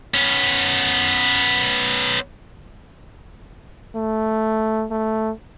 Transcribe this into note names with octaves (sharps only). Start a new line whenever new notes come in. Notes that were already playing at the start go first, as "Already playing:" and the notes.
B3 C#4
A3
A3